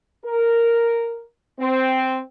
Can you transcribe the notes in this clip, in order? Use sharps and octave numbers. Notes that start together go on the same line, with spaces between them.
A#4
C4